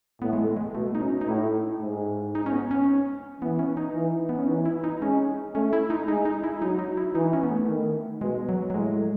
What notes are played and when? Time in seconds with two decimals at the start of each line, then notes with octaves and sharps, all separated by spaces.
0.22 A2 B3
0.33 G#3
0.39 A3
0.57 G#3
0.74 B2 A3
0.95 D#4
1.02 C#4
1.21 D#4
1.27 A2 E4
1.82 G#2
2.35 D#4
2.46 C#4
2.52 B3
2.71 C#4
3.42 E3 B3
3.59 C#4
3.77 D#4
3.95 E3
4.29 B3
4.38 C#4
4.48 E3 D#4
4.65 E4
4.84 D#4
5.02 G#3 C#4
5.54 A3 C#4
5.73 E4
5.90 D#4
6.08 G#3 D#4
6.25 D#4
6.44 E4
6.62 F#3 D#4
6.79 D#4
6.97 E4
7.14 E3 D#4
7.33 C#4
7.43 B3
7.51 A3
7.69 D#3
8.21 B2 G#3
8.49 F#3
8.70 F#3
8.74 A2 G#3